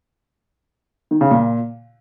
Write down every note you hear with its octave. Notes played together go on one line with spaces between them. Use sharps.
D#3
C#3
A#2